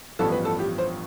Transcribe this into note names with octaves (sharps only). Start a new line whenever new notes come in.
A1 G2 F3 B3 A4
B4
A4
G4
C5